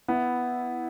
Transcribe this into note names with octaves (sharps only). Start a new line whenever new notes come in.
B3 E4